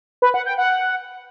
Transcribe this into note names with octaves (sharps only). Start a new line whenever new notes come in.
B4
F#5
G5
F#5